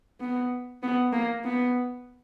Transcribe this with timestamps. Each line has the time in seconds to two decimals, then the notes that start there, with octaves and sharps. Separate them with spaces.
0.20 B3
0.83 B3
1.13 A#3
1.44 B3